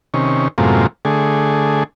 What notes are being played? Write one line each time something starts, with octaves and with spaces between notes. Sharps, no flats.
C3 D#3 C#4
F#2 A2 C3 G#3 A#3 F4
D3 A3 G#4